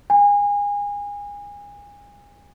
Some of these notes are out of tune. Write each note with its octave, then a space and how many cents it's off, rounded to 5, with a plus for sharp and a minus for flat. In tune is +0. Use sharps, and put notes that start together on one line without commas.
G#5 -30